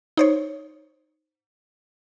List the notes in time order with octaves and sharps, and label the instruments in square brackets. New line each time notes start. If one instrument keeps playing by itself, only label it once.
[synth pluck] D#4 C5 C#5